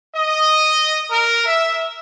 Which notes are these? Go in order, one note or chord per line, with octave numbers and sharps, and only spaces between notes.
D#5
A#4
E5